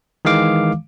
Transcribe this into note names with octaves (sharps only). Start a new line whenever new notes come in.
D#3 E3 G#3 F5 D6